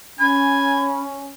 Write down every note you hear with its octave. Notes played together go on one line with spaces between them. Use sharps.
C#4 G#5 B5